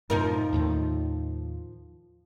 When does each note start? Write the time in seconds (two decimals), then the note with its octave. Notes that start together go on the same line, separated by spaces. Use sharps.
0.10 F#2 A2 C3 F3 D#4 A#4
0.53 D#2 A2 D#3